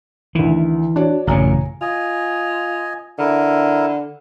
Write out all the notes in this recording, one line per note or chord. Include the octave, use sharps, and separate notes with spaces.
D2 D#3 E3
D4 F#4 C#5 D5
A1 F#2 A#2 C#3 C#5 G#5 A#5
F4 D#5 G#5
D3 E4 A#4